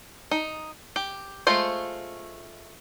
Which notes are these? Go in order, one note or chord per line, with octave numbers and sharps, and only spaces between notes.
D#4
G4
G#3 A3 F4 C5